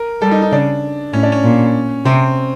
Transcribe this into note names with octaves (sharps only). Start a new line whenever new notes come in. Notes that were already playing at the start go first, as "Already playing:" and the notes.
Already playing: A#4
G3 A4
D#4
D#4
C#3 D4
A2 C#4
D4
C#4
A#2
C3 C4